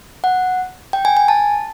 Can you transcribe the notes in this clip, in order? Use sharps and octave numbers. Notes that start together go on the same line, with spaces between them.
F#5
G5
G#5
G#5
A5